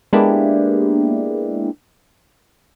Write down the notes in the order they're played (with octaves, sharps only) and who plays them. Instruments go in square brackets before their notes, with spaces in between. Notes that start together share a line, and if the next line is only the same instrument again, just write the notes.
[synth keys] G#3 A#3 B3 D4 E4 G4